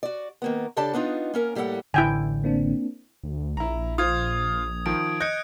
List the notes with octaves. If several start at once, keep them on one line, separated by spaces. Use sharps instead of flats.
F#4 D5
D#3 A#3 B3
C#3 D4 G4 A4 D5 A5
B3 D4 D#4 F4
A#3 C#4 A#4
A2 G3 A#3 A4 F#5
A1 D3 E4 G5 G#5
A#3 C4 D4
D2
A#1 E4 A#5
F4 C5 D#6 G#6
D#3 F3 D7
D#5 F#6 G6 C#7